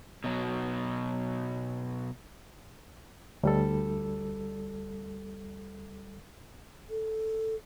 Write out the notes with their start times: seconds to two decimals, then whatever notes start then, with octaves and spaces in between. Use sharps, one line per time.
0.24 B2 F#3
3.43 D2 G3 A4
6.90 A4